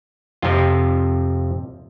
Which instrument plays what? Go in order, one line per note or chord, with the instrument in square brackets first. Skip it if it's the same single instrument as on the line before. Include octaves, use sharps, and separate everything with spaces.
[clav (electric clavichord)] F2 C3 F3 F4